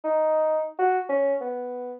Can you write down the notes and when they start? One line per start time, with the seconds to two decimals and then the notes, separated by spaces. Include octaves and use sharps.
0.04 D#4
0.79 F#4
1.09 C#4
1.41 B3